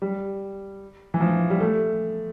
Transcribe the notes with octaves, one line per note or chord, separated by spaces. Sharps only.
G3
E3
F3
G3
A3